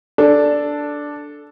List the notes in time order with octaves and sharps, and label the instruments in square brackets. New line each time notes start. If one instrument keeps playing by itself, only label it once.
[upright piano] D4 [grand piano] A4